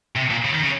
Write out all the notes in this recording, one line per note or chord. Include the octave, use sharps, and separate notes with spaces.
C3
A#2
C#3
D#3
C#3